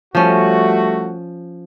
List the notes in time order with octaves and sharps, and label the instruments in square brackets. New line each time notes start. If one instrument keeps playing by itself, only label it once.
[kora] F3 C#4 [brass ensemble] G3 A3 F#4